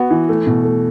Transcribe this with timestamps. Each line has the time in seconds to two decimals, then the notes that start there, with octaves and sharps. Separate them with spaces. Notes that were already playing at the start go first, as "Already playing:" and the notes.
Already playing: B3 F#4
0.11 E3
0.29 A3
0.47 B2
0.64 A3